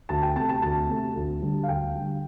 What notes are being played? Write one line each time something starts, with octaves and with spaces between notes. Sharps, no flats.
D2 A5
G5
C3 A3 A5
A5
D2 A5
C3 A3
D2
D3 G3
F5
D2 G5
D3 G3